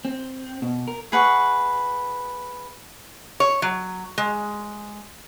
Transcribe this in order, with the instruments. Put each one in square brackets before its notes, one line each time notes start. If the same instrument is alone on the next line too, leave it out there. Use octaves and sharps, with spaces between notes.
[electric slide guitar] C4
B2
A#4
[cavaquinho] G#4 B4 F#5 C#6
[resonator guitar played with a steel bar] C#5
F#3
G#3